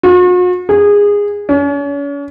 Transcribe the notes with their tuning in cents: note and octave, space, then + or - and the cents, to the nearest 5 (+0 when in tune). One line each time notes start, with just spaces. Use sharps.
F#4 -45
G#4 -20
C#4 +40